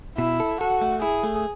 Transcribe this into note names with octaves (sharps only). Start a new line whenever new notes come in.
B2 E4
A4
F#4 A4
A3
E4 G#4
A3